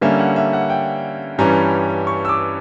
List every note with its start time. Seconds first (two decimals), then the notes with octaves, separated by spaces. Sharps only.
0.01 D3 G3 A#3 C#4 E5
0.19 F#5
0.36 E5
0.53 F#5
0.70 G5
1.38 G2 E3 G3 C#4 A#5
2.07 C#6
2.25 E6
2.29 D6